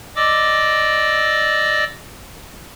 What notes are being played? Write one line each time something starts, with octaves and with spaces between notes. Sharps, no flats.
D5 D#5 D6 E6